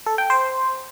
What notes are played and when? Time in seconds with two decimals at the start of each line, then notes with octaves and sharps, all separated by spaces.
0.06 A4
0.18 G5
0.30 C5